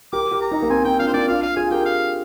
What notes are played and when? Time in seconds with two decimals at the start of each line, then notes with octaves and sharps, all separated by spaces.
0.13 G4 A#4 D6
0.31 G4 A#4
0.42 A#5
0.51 D#4 G4
0.62 A#3
0.70 C4 G#5
0.85 C4 G5
0.99 D4 F4 F5
1.08 C5
1.13 A#3 D4 D5
1.28 D4 F4 F5
1.43 F5
1.57 F4 G#4 G#5
1.71 G4 A#4 G5
1.86 F5